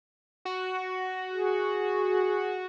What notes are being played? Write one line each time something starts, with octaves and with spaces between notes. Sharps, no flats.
F#4
G#4